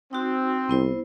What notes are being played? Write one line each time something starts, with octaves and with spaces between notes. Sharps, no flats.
C4 D#4 F#4
C2 B3 E4 C5